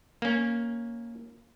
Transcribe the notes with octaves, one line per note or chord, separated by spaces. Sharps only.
A#3 C#4